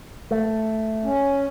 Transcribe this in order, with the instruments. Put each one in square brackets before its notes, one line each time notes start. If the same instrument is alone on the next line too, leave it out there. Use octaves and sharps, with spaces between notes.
[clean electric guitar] A3
[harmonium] C#4